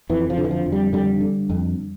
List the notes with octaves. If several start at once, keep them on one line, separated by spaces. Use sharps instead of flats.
F2 E3
F3
D3
E3
F3
F2
G3
D3 G3
D3
F2